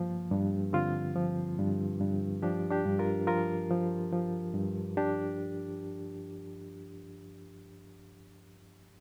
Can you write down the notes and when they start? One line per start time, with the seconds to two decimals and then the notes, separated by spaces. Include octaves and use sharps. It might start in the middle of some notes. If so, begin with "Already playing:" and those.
Already playing: G2 F3 A#3
0.31 G2
0.73 D3 C4 F4
1.16 F3
1.58 G2
2.01 G2
2.42 F3 D4 G4
2.71 D4 G4
2.85 G2
2.99 F4 A#4
3.27 F3 F4 A#4
3.71 F3
4.12 F3
4.54 G2
4.97 D4 G4